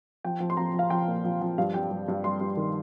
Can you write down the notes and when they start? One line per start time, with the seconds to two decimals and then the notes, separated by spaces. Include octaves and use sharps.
0.24 F3 G5
0.40 F3
0.50 C6
0.57 F3 A#5
0.74 F3 F5
0.90 F3 G5
1.08 A#2
1.25 F3
1.41 F3
1.58 G2 F5
1.74 G3 G5
1.91 G2
2.08 G2
2.24 G3 C6
2.41 G2
2.57 D#3